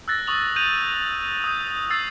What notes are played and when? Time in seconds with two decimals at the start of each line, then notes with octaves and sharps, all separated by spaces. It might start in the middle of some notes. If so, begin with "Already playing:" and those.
0.08 E6 F#6 A6 A#6
0.27 C#6 D#6 F#7
0.56 G6 D#7 F7
1.44 D#6 G6
1.90 E6 A6 C7